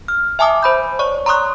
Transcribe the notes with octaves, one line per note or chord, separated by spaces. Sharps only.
F6
E5 G#5 A5 D6 D#6
C5 B5 G6
C#5 D5 C#6
A#5 C6 C#6 D#6 F#6